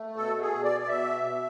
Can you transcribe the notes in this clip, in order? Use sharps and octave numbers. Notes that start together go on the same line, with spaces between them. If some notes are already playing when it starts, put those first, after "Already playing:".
Already playing: A3
B2 A4
G#4
B2
D5
D5
B2 E5
B2